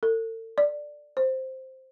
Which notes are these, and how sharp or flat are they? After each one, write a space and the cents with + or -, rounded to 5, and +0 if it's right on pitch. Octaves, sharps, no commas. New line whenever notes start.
A4 +40
D5 +5
C5 +0